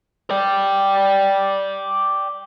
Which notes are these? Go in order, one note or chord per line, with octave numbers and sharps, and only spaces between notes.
D5 G5